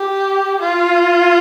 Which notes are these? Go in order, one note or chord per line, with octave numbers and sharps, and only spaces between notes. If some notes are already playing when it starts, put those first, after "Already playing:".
Already playing: G4
F4